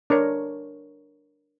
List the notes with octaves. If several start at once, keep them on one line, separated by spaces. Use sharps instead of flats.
D4 A#4 C#5